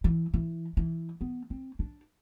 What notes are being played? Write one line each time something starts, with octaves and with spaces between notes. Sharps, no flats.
E3
E3
E3
B3
C4
D4